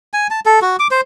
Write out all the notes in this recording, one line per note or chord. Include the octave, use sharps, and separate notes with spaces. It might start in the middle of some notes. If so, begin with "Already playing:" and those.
G#5
A5
A4
F#4
D6
C5